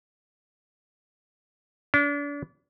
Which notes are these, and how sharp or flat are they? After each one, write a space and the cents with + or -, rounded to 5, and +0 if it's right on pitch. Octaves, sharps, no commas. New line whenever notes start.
D4 -35